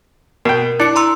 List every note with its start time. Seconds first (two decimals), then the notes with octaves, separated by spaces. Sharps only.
0.45 B2 A#4 G5
0.80 D4 E4 C#7
0.96 A#5 C6 E6